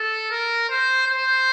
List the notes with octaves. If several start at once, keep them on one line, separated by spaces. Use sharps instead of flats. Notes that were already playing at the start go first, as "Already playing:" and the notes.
Already playing: A4
A#4
C5
C5